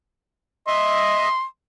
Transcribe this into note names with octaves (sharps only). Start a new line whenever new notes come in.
D#5 E5 C6